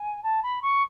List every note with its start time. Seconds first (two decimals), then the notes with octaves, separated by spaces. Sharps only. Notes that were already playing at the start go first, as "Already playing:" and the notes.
Already playing: G#5
0.23 A5
0.43 B5
0.62 C#6